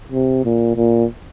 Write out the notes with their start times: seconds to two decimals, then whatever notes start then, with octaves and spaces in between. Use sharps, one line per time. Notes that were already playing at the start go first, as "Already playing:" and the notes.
0.12 C3
0.45 A#2
0.76 A#2